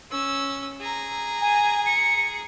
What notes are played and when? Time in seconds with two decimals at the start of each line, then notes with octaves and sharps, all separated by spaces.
0.10 C#4 E6
0.81 G#4 A#5
1.42 G#5
1.86 C#7